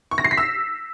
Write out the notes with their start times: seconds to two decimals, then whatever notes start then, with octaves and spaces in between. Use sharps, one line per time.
0.11 C#6
0.18 A#6
0.24 C7
0.31 B6
0.38 E6